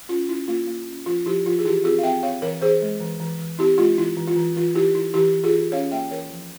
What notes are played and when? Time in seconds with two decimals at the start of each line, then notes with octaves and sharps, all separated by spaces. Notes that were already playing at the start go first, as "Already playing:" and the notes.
0.09 C#4 F4
0.29 C#4 E4
0.48 A#3 F4
0.67 A#3
0.87 C#4
1.06 F3 F4
1.26 F3 E4 G4
1.45 F3 F4
1.59 G#4
1.64 E3 E4 G4
1.84 C4 F4 G#4
1.98 F5
2.03 C4 E5 G5
2.23 C4 C#5 F5
2.42 E3 A#4 C#5
2.61 E3 G#4 C5
2.82 G#3
3.00 E3
3.20 E3
3.39 E3
3.59 C4 E4 G4
3.78 G#3 F4
3.97 E3 E4
4.17 E3
4.27 F4
4.36 E3
4.56 E3 F4
4.75 E3 E4 G4
4.95 E3 E4
5.14 E3 E4 G4
5.34 E3
5.44 F4 G#4
5.54 E3
5.72 C#4 C#5 F5
5.91 A#3 E5 G5
6.11 E3 A#4 C#5
6.30 F3